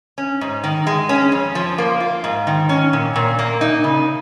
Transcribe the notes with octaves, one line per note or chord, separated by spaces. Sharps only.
C#4
G#2
D#3
G#3
C#4
F2
F3
A#3
F4
G#2
D#3
C#4
A#2
A#2
A#3
D#4
C#3